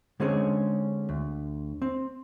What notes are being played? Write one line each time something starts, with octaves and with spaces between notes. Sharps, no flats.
D3 G#3 C4 C#4 G#4 C#5
D2
C4